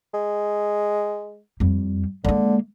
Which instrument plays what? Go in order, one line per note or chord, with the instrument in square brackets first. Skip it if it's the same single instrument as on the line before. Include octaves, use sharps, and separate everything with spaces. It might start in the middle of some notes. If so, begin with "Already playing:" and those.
[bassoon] G#3
[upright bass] F2 G3
[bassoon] D3 [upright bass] G#3 A#3